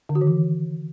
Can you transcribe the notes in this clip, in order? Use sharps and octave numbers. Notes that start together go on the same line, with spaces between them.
D3
F#4
D#3
E3